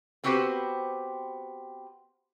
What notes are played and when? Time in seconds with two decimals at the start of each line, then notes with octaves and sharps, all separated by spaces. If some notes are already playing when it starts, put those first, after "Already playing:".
0.24 B3 C4 F#4 G4 B4 C5